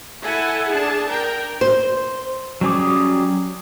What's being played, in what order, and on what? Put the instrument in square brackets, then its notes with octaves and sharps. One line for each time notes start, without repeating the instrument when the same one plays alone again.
[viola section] E4 A4 F#5 G#5
D4 G#4 A5
A#4 G5
[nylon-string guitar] C5
[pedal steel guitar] F#3 G3 C#4 G#4 D6